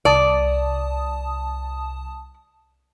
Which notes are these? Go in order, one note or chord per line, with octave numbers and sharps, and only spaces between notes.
C2 D5 A5 D#6